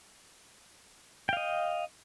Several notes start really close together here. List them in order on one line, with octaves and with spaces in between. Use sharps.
G5 F5 D#5